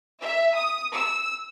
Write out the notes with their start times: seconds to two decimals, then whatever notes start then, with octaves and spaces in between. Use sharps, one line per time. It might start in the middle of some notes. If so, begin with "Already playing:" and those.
0.22 E5
0.57 D#6
0.94 E6